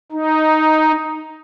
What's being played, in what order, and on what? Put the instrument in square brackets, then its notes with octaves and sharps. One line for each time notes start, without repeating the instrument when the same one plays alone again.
[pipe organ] D#4